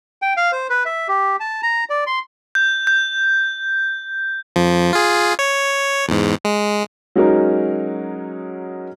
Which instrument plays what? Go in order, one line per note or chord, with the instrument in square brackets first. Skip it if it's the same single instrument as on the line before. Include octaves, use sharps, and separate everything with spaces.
[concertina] G5
F5
C5
B4
E5
G4
A5
A#5
D5
C6
[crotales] G6
G6
[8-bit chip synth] F2 F3
F4 G#4
C#5
E2 G#2
G#3
[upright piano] F#3 G#3 C#4 D#4 F#4 A#4